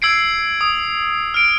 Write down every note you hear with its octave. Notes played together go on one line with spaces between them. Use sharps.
E6 G#6 C7 D7
D#6
F6 D7